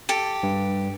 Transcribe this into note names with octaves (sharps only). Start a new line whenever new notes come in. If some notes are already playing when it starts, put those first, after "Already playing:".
G4 A4
G2